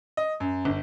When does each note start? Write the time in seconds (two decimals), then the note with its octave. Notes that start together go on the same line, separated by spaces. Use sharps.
0.17 D#5
0.40 F#2
0.65 G1